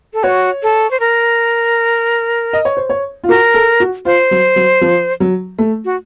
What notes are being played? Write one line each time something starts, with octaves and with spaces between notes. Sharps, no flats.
A4
F#4 C#5
A4
C5
A#4
D#5
C#5
C5
C#5
F4
F#4 A#4
A4
F#4
F4 C5
F#3
F#3
F3
F#3
A3
F#4